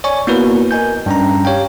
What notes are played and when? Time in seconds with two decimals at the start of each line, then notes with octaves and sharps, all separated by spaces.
0.04 C#5 D5 G#5 C#6
0.27 A#3 B3 E4 F#4 A#4 B4
0.71 A#4 D#5 G#5 G6
1.06 G2 C#4 A#5
1.45 G4 C#5 F5 G5